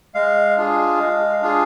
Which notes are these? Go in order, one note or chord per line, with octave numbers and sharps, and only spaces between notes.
G#3 F5
D4 F4 G#4
G#3
D4 F4 G#4